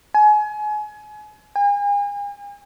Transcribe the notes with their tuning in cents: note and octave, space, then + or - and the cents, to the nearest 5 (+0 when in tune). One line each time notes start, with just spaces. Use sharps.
G#5 +30
G#5 -40